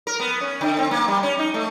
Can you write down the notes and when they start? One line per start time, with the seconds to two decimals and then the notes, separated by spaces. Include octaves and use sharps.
0.07 A#4
0.20 B3
0.41 C#4
0.61 D3
0.79 C4
0.91 A#3
1.08 G3
1.23 C#4
1.39 D#4
1.54 A3